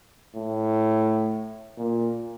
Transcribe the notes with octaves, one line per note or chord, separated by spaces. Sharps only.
A2
A#2